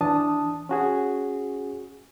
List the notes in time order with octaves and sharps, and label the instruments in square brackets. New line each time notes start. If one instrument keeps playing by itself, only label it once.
[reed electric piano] E3 D4 A5 D#6
C#4 F#4 G#4